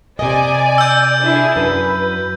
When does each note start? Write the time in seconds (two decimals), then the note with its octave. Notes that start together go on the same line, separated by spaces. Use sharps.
0.19 C3 D5 D#5 G#5
0.78 E6 G6
1.21 D4 E4 G#4
1.56 F#2 B4